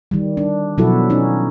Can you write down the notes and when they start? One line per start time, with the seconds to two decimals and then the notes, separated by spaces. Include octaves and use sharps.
0.11 D#3 G3
0.37 D4
0.78 B2 F3 F#3 E4 F#4 A4
1.10 C#4 D#4